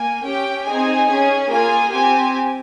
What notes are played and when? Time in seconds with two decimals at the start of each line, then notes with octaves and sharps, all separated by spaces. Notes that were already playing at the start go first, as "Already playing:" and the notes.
Already playing: A#3 G#5
0.24 C#4 G4 G5
0.66 C4 D#4 G#4 G#5
1.09 C#4 G#4
1.50 A#3 F4 G#4 G#5
1.91 C4 G4 G#5